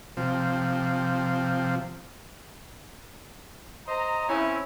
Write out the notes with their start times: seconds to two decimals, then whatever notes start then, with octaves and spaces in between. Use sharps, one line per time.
0.17 C3 F3
3.87 C5 D#5 A#5
4.29 C4 C#4 E4